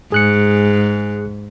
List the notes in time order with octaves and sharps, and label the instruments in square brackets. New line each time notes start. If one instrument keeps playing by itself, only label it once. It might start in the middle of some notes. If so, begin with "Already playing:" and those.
[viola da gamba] G#2 [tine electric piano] G#4 F#6 C#7